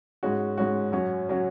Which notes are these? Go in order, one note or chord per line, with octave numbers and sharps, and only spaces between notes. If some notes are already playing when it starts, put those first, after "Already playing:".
G#2 G#3 C#4 F#4
G#2 G#3 C#4 F#4
F#2 F#3 C#4 F#4
F#3 C#4 F#4